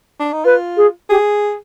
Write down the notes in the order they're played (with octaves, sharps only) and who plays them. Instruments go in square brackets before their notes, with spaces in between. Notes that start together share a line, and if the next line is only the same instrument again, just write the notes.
[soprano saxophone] D4
D#4
[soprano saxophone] F4 [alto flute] B4
[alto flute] G#4
[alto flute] G4 [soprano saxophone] G#4